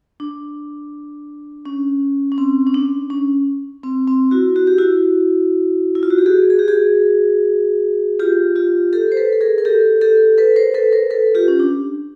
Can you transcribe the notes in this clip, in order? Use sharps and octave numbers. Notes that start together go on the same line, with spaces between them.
D4
C#4
C#4
C4
C#4
D4
C#4
C4
C4
E4 F#4
F#4
G4
E4 F#4
E4
F4
F#4
G4
F#4 G#4
G#4
G4
F#4 G#4
F4 G4
F4 G4
G4 A4
C5
A4 B4
A4
G#4 A#4
A#4
G4 A4
G4 A4
A4 B4
A#4 C5
A4 B4
A#4 C5
A4 B4
F4 G4
C#4
D4